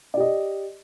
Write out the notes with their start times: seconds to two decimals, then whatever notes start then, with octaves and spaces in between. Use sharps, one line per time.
0.14 D5
0.17 G4
0.20 D#5